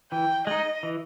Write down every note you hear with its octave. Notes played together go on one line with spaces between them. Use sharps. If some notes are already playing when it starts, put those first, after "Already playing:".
E3 G5
G#3 D#4 D#5
E3